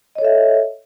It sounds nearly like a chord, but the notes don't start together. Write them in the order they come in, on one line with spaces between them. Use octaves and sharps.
D#5 C#5 A4 E5